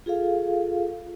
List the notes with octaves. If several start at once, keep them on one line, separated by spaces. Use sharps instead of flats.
F4 G#4 A4 F5